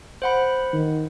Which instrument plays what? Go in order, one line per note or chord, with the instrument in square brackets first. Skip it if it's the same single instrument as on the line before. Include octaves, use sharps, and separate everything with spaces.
[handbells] C5 F#5 B5
[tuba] D#3